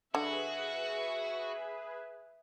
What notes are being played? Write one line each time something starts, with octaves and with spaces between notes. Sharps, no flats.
D3 F#4 G#4 B4 E5